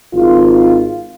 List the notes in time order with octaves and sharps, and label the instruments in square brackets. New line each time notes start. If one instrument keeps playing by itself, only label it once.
[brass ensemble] G#1 F4